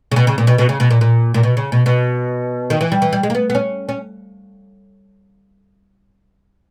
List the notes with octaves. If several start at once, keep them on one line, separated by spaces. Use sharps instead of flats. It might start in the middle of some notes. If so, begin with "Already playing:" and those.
C#3
B2
C#3
A#2
B2
B2
C#3
B2
A#2
A#2
A#2
B2
C#3
B2
B2
D#3
E3
G3
E3
G3
G#3
A#3
B3
B3
C#4
C#4